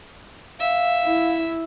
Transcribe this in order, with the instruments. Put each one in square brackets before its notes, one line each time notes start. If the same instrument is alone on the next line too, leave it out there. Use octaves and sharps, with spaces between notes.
[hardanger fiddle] E5 [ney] F5
[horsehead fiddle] E4